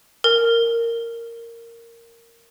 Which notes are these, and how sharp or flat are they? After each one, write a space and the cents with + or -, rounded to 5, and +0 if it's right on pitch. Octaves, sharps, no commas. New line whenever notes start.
A#4 -10